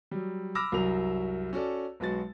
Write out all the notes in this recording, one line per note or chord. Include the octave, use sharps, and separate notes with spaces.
F#3 G3
B5 D6 E6 F6 A#6
C2 F#2 F#3 F#4 A#4 F7
C#4 F#4 A4 D5
B1 G#3 B3 F#4 A6